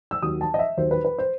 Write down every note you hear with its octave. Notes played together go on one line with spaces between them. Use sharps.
E6
D#2 D#3 F#3 D#6
A5
D#5
E5
D#2 D#3 F#3 C5
B4
B4
C5